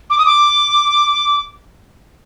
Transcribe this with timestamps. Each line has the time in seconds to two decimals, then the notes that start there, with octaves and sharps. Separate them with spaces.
0.10 D6
0.18 D#6
0.26 D6